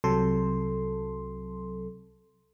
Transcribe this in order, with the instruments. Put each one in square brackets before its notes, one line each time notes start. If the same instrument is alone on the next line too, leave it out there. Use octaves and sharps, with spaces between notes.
[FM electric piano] C2 C3 F#3 A4 C6